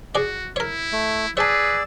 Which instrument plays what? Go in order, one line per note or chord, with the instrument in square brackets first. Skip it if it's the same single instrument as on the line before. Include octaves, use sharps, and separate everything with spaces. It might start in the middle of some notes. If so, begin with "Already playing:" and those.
[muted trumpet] F#4 [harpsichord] G#4 D5
[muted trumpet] E4 [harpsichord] A#4 C#5
[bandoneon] A3
[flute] G#4 [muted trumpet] B4 [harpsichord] C#5 A5 [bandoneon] D5 E6